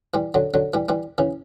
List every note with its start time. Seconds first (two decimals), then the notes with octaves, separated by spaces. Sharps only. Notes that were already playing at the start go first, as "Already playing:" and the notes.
0.14 E3 G3
0.34 D3 F#3
0.54 D3 F#3
0.74 E3 G3
0.89 E3 G3
1.18 C#3 E3